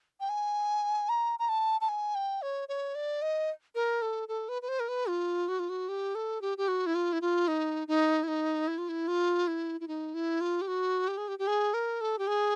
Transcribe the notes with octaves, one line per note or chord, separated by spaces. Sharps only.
G5
G#5
A#5
A#5
A5
A5
G#5
G5
C#5
C#5
D5
D#5
A#4
A4
A4
B4
B4
C5
A#4
B4
F4
F#4
F4
F#4
G4
A4
G4
G4
F#4
E4
F4
E4
F4
D#4
D#4
E4
D#4
E4
F4
E4
F4
E4
E4
D#4
E4
F4
G4
F#4
G4
G#4
G4
G4
G#4
A#4
A4
G4
G#4